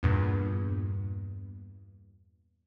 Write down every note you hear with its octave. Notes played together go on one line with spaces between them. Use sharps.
E2 G2 A#2